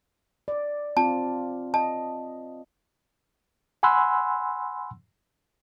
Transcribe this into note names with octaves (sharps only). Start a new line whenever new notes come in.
D5
C4 F4 A5
D#5 A5
F#5 G#5 B5 C6 E6 F#6